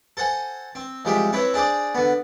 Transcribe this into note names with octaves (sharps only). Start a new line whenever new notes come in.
A4 C5 F#5 G#5
C4
C2 F3 G#3 G4 E5
C4 E4 B4 C#5
D4 G#4 C5 D5
D3 B3